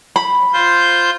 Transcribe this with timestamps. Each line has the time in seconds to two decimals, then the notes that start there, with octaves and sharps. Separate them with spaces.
0.16 B5
0.53 F4 C5 G6